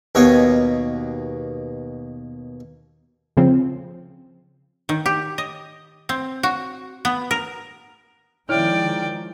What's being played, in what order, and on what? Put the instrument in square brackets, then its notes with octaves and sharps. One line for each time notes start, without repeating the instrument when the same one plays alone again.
[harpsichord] D#2 B2 C#5 D#5
[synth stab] C#3 F3 C4
[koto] D#3
G4
D#5
C4
F#4
B3
A#4
[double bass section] D#3 F3 G#3 [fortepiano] E4 C#5 F6 [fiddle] D5 G5